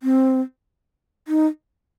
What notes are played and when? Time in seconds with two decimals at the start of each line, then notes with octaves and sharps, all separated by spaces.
0.03 C4
1.28 D#4